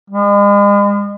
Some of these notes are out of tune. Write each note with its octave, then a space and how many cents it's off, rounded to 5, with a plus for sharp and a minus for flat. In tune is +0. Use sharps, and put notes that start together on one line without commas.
G#3 -40